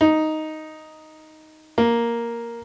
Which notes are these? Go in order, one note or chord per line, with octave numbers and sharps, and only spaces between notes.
D#4
A#3